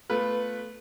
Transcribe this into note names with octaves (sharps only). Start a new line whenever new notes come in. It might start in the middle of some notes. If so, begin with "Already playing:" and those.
A3 B3 F4 B4